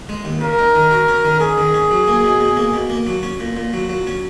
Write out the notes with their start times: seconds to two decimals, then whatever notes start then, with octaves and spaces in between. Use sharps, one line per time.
0.09 G#3
0.25 D#2
0.41 C#3 A#4
0.59 D#4
0.75 D#3
0.91 F#4
1.08 C#4
1.25 D#3
1.41 C#4 G#4
1.58 D#3
1.74 C#4
1.91 F#3
2.07 A#3
2.24 B2
2.40 B2
2.57 A#3
2.74 B2
2.90 A#3
3.07 F#3
3.23 C#4
3.40 A#2
3.57 A#2
3.74 F#3
3.89 F#3
4.07 C#4